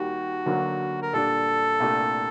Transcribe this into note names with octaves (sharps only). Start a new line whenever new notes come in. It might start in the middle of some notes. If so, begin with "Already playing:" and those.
Already playing: D#2 D#3 G3 F#4
D2 D3 F#3 A#3
A#4
A#2 G3 D4 A4
C2 A#2 A3 D4 G4